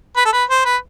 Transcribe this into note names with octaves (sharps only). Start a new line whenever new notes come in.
B4
A4
B4
C5
B4